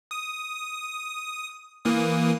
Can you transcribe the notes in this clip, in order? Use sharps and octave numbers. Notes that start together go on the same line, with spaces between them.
D#6
E3 A#3 D#6